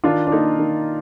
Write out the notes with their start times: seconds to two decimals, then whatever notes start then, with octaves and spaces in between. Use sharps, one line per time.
0.04 D#3 D4 F4
0.27 D4
0.32 A#3 D#4
0.59 D#3